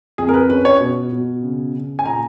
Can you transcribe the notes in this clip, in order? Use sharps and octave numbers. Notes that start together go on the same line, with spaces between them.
F2 G#4
A#4
B4
C#4 B4
C#5
B2
B2
C#3
C#3
G#5
A#2 A#5